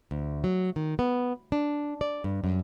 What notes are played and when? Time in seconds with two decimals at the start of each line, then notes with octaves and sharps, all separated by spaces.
0.11 D2
0.44 F#3
0.76 D#3
0.99 B3
1.52 D4
2.01 D5
2.24 G2
2.44 F#2